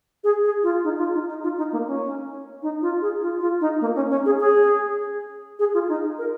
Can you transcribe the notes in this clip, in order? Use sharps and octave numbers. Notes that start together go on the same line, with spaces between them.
G#4
G#4
F4
D#4
F4
D#4
D#4
F4
D#4
A#3
C#4
D#4
F4
G#4
F4
F4
D#4
A#3
C#4
C#4
G#4
G#4
G#4
F4
D#4
A#4